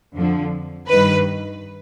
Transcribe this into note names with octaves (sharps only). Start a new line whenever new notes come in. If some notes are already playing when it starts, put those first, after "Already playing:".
F2 D3 F3
G2 D#3 B4